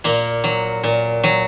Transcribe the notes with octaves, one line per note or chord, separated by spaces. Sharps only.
A#2 A#3
F#3
A#2
F#3